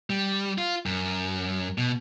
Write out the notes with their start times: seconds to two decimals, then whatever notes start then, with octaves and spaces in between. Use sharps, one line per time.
0.10 G3
0.58 F4
0.86 F#2
1.78 B2